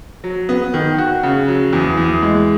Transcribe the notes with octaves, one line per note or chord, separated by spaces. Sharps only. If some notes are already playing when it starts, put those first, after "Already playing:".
F#3
B3
D#3
F#4
C#3
F#3
E2
E2
G#3